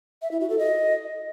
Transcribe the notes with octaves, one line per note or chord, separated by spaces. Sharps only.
E5
E4
F#4
A4
D#5